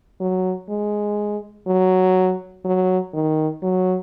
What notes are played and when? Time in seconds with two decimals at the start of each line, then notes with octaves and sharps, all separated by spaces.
0.21 F#3
0.69 G#3
1.67 F#3
2.65 F#3
3.14 D#3
3.62 F#3